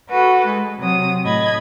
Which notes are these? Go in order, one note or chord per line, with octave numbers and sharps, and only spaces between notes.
F#4 A4 B4
G#3
C3 F#3 D#6
A2 D#5 B5 G#6